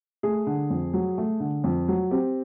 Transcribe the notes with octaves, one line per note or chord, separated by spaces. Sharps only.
A3 G#4
D3
F2
F#3
A3
D3
F2
F#3
C4 G4